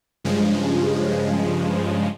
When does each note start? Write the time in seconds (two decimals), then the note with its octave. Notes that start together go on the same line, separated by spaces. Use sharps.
0.25 G2 C#3 F3 G#3